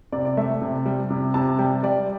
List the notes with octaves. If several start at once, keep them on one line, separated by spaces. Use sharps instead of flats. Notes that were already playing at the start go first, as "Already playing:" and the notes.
C3 D5
D5
A3 E5
C3
G3
C3
C3 A5
G3 G5
G3 D5